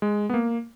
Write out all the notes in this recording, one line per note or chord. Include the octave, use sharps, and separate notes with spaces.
G#3
B3
A#3